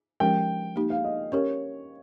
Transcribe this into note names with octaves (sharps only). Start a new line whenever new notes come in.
F3 G#3 C#4 G4 A#4 G5
A#3 D#4 G4
F5
D#5
C#4 G4 A#4 C#5